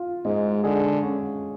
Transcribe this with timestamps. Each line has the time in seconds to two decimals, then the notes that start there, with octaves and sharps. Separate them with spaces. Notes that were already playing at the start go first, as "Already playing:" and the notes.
Already playing: F4
0.25 G#2 G#3
0.64 D3 G#4
1.03 C#4